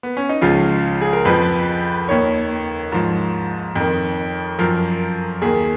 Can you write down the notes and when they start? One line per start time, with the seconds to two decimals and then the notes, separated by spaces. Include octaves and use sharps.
0.03 B3
0.17 C#4
0.29 D#4
0.41 C#2 C#3 F3 F4
1.01 G#4
1.13 A#4
1.25 F2 F3 B4
2.08 D#2 D#3 C#5
2.92 G#2 F3
3.76 F2 D#3
4.59 F#2 F3 A#4
5.42 D#2 D#3 G#4